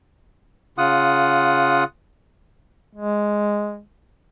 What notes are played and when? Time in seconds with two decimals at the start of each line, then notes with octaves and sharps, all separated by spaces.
0.78 C#3 F4 F#5 D#6
2.95 G#3